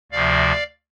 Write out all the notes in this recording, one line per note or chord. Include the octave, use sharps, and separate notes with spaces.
D2 C3 F3 D5 F5